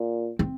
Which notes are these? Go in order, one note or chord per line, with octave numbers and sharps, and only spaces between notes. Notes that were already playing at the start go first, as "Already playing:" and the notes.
Already playing: A#2
C4